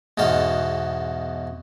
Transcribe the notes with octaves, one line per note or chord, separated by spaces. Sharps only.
E2 G#2 B2 A4 F5